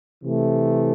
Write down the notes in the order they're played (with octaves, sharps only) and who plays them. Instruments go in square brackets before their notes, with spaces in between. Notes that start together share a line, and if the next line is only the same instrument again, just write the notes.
[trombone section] C3 E3 A3